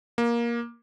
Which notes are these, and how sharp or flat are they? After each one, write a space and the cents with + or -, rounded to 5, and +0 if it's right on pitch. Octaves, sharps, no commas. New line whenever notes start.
A#3 +15